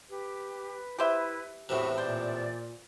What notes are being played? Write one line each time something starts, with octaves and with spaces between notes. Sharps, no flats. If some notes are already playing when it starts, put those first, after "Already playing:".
G4 B4
E4 G4 B4 C5 E5
E2 A2 C3 F#4 B4
A#2 C5 D5